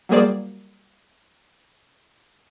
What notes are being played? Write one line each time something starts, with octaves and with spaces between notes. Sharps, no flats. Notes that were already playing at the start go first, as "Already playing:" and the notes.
F#3 G3 A#3 G#4 C5 D5